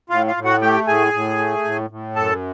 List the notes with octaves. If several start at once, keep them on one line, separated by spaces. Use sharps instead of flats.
A2 F4 F5
F4 F5
A2
F#4 F#5
A3 G4 G5
A2 G#4 G#5
A2
A3
A2
A2
F#2 A4 A5